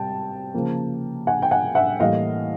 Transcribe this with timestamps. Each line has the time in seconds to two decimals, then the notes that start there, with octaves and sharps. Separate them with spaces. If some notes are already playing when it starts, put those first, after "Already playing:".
Already playing: C3 G3 G5 A5
0.54 C#3 F3 A#3
1.27 F#5 G#5
1.42 G5
1.51 F#5 G#5
1.75 E5 F#5
2.00 A2 E3 G3 A#3 D#5 F5